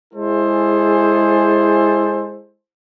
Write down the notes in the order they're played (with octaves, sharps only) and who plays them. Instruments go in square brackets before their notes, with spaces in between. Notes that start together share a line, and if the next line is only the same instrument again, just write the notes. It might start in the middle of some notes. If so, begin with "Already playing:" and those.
[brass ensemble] G#3 E4 G#4 A4 C5